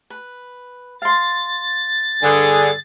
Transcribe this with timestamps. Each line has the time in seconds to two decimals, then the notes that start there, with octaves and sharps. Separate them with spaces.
0.10 B4
1.02 F5 C6 A6
2.22 G2 D3 G#4